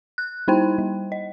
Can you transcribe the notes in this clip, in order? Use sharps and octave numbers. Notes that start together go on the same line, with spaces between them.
F#6
G3 D#4 E4 C5 G5
G3
D#5